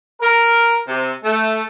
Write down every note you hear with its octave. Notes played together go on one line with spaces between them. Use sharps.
A#4
C3
A3